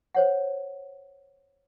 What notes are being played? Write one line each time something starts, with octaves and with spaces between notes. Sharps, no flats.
C5 C#5 F#5